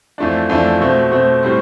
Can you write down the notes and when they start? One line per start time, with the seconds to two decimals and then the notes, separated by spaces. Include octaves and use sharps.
0.18 F2 E3 A3 D4
0.50 F2 E3 A3 D4
0.80 B2 A3 C4
1.11 B2 A3 C4
1.43 A2 G3 C4